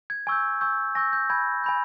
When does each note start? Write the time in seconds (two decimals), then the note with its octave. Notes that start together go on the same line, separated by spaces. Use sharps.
0.10 G#6
0.27 G#5 C#6 E6 G6 G#6
0.61 G#5 C#6 E6 G6
0.95 G#5 C#6 E6 G6 A#6
1.13 G6
1.29 G#5 B5 G6 G#6
1.64 G#5 B5 G6